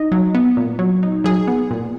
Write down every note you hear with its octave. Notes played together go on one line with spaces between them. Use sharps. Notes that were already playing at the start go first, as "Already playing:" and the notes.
Already playing: D#4 D#5
F#3
B3
A#2
F#3
D#4
F#3 G#4
B3
A#2